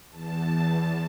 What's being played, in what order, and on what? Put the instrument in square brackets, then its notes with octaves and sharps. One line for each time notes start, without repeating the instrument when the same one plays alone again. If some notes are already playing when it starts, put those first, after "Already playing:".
[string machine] E2 A5